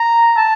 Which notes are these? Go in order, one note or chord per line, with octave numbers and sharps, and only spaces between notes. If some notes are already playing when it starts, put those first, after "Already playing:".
Already playing: A#5
A5